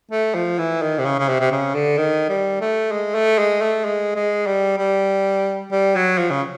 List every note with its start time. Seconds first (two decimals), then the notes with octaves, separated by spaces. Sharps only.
0.11 A3
0.35 F3
0.58 E3
0.82 D#3
0.99 C3
1.05 C#3
1.19 C#3
1.28 C3
1.40 C3
1.52 C#3
1.74 D3
1.98 D#3
2.29 G3
2.61 A3
2.92 G#3
3.15 A3
3.38 G#3
3.62 A3
3.85 G#3
4.16 G#3
4.47 G3
4.78 G3
5.71 G3
5.96 F#3
6.18 F3
6.30 C#3